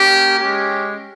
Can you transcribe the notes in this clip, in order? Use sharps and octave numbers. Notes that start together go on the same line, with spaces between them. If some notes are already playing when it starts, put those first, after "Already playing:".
Already playing: A#3 C#4 G4
G#3 C#4 G4